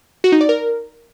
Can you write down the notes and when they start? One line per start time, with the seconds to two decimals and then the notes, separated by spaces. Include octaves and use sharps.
0.24 F#4
0.32 D#4
0.41 D5
0.49 A#4